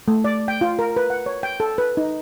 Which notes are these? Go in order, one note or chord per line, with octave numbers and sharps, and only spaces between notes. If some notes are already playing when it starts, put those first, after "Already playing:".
A3
D5
G5
F4
A#4
B4
F#5
C#5
G5
A4
B4
D#4